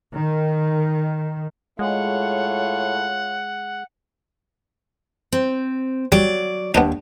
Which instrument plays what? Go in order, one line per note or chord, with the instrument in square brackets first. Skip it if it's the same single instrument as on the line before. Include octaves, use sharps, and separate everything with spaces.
[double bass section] D#3
[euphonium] A2 [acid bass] G#3 [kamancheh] F4 C#5 [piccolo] F#5
[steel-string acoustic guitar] C4
[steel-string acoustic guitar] F#3 D5 [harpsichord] G3
[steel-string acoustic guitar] D#2 [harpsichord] B3 D4 D#4